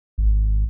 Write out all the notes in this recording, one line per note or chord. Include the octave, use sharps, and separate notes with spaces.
G#1